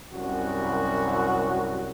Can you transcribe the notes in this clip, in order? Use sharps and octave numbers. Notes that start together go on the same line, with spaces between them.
C2 F#2 F#4